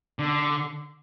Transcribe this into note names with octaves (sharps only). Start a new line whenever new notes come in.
D3